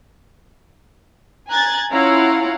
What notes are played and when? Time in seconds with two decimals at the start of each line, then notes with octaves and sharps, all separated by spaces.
1.49 G#5 A#5 F#6 G#6 A6
1.92 C#4 E4 F4 F5 F#5 A#5